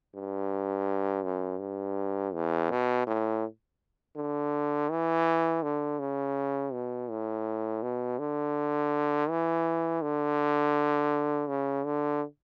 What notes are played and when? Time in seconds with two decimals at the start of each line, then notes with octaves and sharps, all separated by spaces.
0.14 G2
1.24 F#2
1.60 G2
2.34 E2
2.71 B2
3.07 A2
4.16 D3
4.90 E3
5.62 D3
5.99 C#3
6.72 B2
7.10 A2
7.82 B2
8.19 D3
9.29 E3
10.02 D3
11.49 C#3
11.85 D3